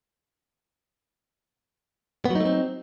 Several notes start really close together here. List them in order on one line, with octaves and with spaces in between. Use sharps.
B3 F#3 D#4 A3 C4